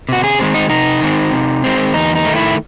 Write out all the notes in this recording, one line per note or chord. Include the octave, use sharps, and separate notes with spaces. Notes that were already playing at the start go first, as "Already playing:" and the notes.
C3 F#4
G#4
D#3 G#3 C4
D#4
C3 D#4
D#3 G#3 C4
C3
D#3 G#3 C4
E2 D#4
D#4
D#3 A3
E4